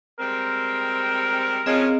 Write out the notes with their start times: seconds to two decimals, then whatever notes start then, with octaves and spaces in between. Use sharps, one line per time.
0.20 G3 G#3 C4 A#4
1.66 F3 G#3 C4 C#4 G#4 D#5